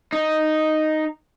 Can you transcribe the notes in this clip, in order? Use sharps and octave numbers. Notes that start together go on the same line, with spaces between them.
D#4